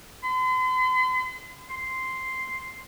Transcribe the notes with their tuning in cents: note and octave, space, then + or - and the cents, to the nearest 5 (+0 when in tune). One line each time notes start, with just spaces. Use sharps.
C6 -45
C6 -5